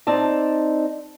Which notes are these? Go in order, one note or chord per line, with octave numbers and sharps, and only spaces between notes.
C4 D#4 D5 A5